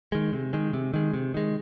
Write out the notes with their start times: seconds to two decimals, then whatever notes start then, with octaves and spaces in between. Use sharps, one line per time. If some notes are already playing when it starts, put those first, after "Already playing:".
0.12 D#3 G#3
0.33 C3
0.53 D#3 G#3
0.73 C3
0.94 D#3 G#3
1.14 C3
1.34 D#3 G#3